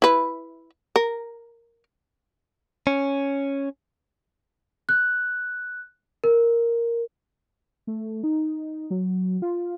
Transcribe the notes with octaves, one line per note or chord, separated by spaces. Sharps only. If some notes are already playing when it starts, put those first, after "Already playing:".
E4 B4
A#4
C#4
F#6
A#4
A3
D#4
F#3
F4